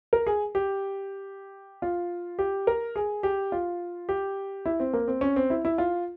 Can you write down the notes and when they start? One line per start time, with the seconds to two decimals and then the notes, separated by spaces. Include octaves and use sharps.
0.13 A#4
0.27 G#4
0.55 G4
1.82 F4
2.39 G4
2.67 A#4
2.96 G#4
3.23 G4
3.52 F4
4.09 G4
4.66 E4
4.80 C4
4.93 A#3
5.08 C4
5.21 C#4
5.36 C4
5.50 E4
5.65 E4
5.78 F4